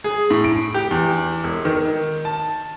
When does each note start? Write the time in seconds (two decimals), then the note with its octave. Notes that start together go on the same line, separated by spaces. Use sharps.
0.04 G#4
0.31 A2
0.44 D7
0.74 G4
0.91 E2
1.44 E1
1.65 D#3
2.25 A5